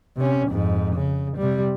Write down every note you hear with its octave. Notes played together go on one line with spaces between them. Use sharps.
C3 C#4
F2 G#2
C#3
C3 G3